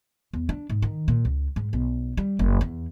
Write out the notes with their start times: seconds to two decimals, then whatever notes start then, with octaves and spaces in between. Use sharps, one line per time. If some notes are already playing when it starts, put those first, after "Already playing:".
0.33 E2
0.49 D4
0.70 G#2
0.82 D#3
1.08 A#2
1.25 C#2
1.56 G#2
1.73 B1
2.17 G3
2.39 F#1
2.61 E2